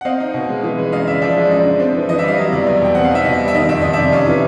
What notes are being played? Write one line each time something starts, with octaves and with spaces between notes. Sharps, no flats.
F#5
C4 D#5 F5
D#4
B2
G#3
E3
G#3
F#2 D#5 F5
C#3 D5 E5
F3 D5 E5
G#3 D5
F#2 D#5
D3
C4
E3
E3 D#5
D5 E5
G3 D#5 F5
F#3 D#5
E2 D5
E2
B2 G5
C4 F#5
F5
D#4 E5
B2 D#5
G3
E5
D#3 D#5
F2 E5
F2 D#5
C3 D5 E5
C#4 D#5 F5
E3